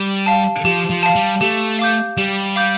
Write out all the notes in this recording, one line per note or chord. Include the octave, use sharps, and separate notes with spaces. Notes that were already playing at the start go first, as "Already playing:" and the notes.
Already playing: G3 G4
F5 A5
F3 G4
F3
F5 A5
G3
A3 G4
F5 D6 G6
G3 G4
F5 D6 G6